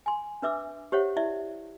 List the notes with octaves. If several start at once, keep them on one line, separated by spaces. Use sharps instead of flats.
G#5 C6
D4 B4 E5 D6 E6
G4 C5 C#5 E5 F#5
E4 D5 E5